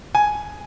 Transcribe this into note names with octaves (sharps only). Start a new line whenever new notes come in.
G#5